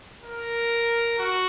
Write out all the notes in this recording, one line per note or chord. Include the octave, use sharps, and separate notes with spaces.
A#4
F#4